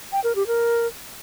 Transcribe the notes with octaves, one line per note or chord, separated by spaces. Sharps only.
G5
A#4
G4
A#4